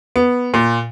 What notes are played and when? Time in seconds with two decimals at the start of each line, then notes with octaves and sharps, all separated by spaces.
0.16 B3
0.54 A#2